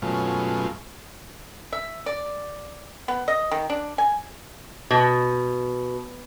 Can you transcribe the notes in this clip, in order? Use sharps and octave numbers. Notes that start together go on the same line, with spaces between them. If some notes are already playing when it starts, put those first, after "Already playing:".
F#2 B2 G#3 A3 C#4 F4
E5
D5
B3
D#5
D#3
D4
G#5
B2